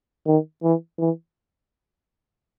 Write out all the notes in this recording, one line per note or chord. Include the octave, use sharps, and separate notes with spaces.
D#3
E3
E3